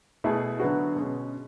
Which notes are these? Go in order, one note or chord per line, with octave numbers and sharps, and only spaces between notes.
B2 A3 E4 G#4
D3 F#3 B3 F#4
B2 G#3 C#4